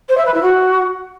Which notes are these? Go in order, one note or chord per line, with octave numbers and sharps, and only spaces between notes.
C5
E5
B4
E4
F#4